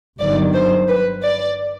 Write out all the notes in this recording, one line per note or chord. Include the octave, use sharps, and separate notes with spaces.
G1 G2 D#3 F#3 D5
C5
B4
D5